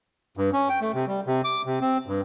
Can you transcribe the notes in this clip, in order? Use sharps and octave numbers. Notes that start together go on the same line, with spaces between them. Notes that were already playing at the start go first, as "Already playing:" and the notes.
G2
C#4
G5
A3
C3
G3
C3
D6
C3
C4
G2